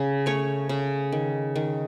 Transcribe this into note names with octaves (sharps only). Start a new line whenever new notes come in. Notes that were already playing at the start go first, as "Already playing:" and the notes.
Already playing: C#3
A3 C#5
C#3
D#3
D#3